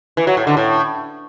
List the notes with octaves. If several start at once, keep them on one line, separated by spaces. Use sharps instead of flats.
E3
F#3
A2
D3
A2